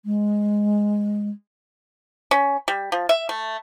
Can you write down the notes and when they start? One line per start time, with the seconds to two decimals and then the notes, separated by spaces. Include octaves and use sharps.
0.05 G#3
2.31 C#4
2.68 G3
2.92 F3
3.09 E5
3.29 A3